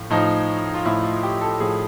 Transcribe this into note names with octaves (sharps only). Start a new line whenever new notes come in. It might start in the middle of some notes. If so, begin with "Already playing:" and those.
Already playing: A2 F3
A2 F3 D#4
F4
A2 F3 E4
F4
G4
A4
A2 F3 G#4